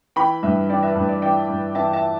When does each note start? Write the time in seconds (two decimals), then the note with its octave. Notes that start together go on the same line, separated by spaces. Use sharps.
0.16 E3 G5 B5
0.43 G2 B4 E5
0.69 E3 D5 G5
0.83 B4 E5
0.95 G2 B4
1.09 D5
1.22 E3 D5 G5
1.49 G2
1.75 E3 E5 A5
1.93 E5 A5